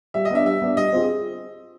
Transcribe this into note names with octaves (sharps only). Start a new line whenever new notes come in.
G3 E5
D#5
B3 D4 E5
G3 E5
B3 D4
G3 D#5
C4 F4 G#4